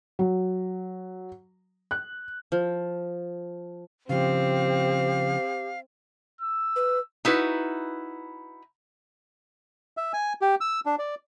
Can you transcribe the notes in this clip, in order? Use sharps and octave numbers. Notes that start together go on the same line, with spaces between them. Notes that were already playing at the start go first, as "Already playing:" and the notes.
F#3
F#6
F3
C#3 F3 C4 G4 F5
E6
B4
D#4 E4 F#4 B4
E5
G#5
G4
E6
D4
D5